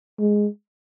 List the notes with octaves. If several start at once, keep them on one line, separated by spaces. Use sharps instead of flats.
G#3